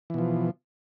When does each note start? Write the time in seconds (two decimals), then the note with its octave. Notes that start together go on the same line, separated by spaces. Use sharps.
0.10 E3
0.14 B2
0.18 F3